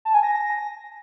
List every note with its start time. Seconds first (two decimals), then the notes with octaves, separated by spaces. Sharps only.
0.05 A5
0.14 G#5
0.23 A#6